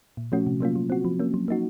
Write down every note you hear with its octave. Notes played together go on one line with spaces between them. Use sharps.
A#2
F3 A3 C#4 F#4
C3
F#3 A#3 C#4 F4
F#3
C4 F#4
F3
A#3 C#4
F#3
A#3 D#4 F#4